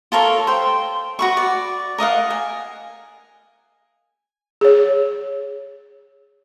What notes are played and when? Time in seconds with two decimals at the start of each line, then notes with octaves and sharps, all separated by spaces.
0.12 F4 A4 A#4 C#5
0.47 C5 G5
1.19 F#4 B4 C#6
1.37 D5
1.98 A#4 D#5 F5 F#5
2.30 G#5
4.61 G#4 C#5